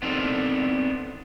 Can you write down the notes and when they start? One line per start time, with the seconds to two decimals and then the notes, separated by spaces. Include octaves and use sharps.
0.02 B3 C4 D4 D#4 A4 A#4